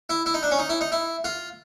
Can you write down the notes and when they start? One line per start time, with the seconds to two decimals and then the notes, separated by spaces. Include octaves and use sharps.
0.10 E4
0.26 E4
0.34 D#4
0.43 D4
0.51 C#4
0.59 D#4
0.69 E4
0.81 D#4
0.92 E4
1.24 F4